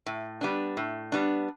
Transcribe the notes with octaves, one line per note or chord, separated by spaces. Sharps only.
A2
G3 B3 D4
A2
G3 B3 D4